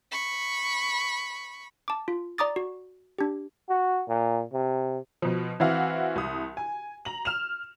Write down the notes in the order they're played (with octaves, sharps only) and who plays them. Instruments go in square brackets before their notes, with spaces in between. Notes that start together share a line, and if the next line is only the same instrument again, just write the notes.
[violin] B5 C#6
[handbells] A5 D6
F4
D5 A#5 D6 D#6 A6
F#4
D4 G4
[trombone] F#4
A#2
C3
[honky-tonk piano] B2 F3
E3 C4 E4 F#4 F5
C2 D#6
G#5
A#5 F#7
F6 E7 F7